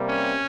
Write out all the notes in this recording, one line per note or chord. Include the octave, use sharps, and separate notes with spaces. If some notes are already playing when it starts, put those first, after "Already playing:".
Already playing: C3 G3 A#3
C#4